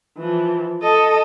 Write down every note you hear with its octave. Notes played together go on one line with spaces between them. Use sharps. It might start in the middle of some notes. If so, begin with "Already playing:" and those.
E3 F3
A4 D#5